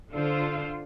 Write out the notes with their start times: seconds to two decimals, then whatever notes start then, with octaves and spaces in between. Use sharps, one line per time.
0.14 D3 D4 F4 A4 C5